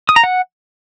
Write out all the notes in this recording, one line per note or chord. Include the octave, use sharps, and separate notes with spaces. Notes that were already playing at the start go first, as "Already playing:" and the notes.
D#6
A#5
F#5